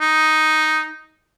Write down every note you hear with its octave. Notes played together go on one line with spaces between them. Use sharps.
D#4